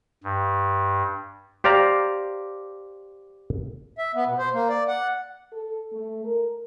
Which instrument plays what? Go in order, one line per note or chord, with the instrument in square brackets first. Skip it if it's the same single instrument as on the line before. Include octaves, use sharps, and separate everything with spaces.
[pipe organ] G2
[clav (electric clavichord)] G4 C5 D5 F5 A#5
[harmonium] E5
B3
B2
C5
A#3
D5
F#5
[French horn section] A4
A3
A#4